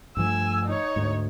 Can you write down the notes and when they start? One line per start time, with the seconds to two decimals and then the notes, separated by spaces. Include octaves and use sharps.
0.17 G2 F3 A3 G#5 E6
0.66 D#4 C#5
0.96 D2 G#2